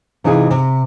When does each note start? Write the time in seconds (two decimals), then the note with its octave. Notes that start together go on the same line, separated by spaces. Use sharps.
0.24 C3 E3 D#4 F4 G#4
0.50 C3